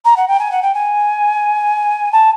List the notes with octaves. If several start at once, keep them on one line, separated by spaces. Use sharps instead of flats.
A#5
F#5
G5
G#5
F#5
G5
G#5
A5